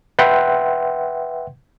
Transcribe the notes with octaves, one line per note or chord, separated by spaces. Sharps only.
B4 E5 F#5 G5 C6